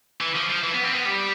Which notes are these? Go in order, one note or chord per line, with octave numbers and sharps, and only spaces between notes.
E3
F3
F3
E3
B3
C4
B3
G3